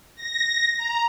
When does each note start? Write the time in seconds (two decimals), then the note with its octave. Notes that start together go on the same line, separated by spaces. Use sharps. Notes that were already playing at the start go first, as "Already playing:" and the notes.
0.15 A#6
0.77 A#5